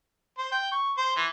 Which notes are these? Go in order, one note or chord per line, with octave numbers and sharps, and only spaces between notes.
C5
G5
C#6
C5
E3